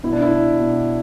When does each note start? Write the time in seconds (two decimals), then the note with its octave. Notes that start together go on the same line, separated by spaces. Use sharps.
0.03 B2 E4
0.12 D4
0.22 E4
0.59 B2